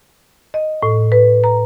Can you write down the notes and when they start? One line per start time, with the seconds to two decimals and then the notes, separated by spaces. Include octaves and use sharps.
0.54 D#5
0.83 A2
1.12 B4
1.44 A#5